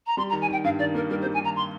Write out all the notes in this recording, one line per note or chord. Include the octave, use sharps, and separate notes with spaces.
A#5
G3 C6
A#5
D#3
G#5
D#3 G5
G2 F5
D#3 D5
A#3 A#4
G3 A#4
C5
G3
G#5
D#3 A#5
C6